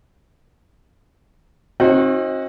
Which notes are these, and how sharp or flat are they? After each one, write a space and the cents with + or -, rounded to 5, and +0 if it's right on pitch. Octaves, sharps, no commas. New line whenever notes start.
C4 +40 D#4 +25 F#4 -20